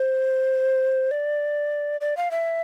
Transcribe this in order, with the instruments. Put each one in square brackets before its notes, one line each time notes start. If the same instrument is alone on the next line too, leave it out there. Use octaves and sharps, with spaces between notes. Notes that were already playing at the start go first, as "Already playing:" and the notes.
Already playing: [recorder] C5
D5
D5
F5
E5